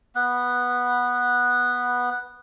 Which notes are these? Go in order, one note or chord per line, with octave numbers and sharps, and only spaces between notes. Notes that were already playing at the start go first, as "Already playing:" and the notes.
B3 B4